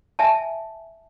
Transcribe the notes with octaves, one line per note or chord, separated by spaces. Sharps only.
E5 G#5 A5